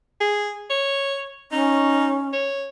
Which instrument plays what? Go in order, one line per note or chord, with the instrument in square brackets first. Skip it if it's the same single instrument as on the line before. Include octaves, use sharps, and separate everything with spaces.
[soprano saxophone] G#4
C#5
[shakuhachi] C#4 [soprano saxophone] D#4
[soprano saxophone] C#5